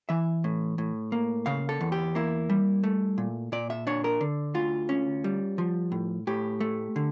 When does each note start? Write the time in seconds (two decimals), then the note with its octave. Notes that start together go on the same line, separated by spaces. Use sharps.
0.09 E3 E5
0.44 A2
0.78 A2
1.12 A#3
1.46 C#3 F5
1.69 A4
1.81 E2
1.92 G4
2.15 A#3 E4
2.50 G3
2.84 A3
3.18 A#2
3.52 A#2 D5
3.70 E5
3.87 D4 C#5
4.04 A#4
4.21 D3
4.54 D2 F4
4.89 C#4
5.24 G3
5.58 F3
5.92 A2
6.27 A2 G4
6.60 A3
6.96 D3